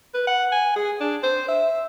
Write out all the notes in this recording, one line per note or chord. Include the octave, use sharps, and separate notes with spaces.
B4
F#5
G#5
G#4
D4
C5
E5